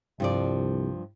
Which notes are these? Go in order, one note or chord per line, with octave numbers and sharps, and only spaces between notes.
C2 G2 F3 D5